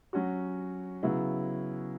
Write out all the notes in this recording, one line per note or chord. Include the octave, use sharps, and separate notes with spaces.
F#3 C#4 F#4
C#3 F#3 B3 E4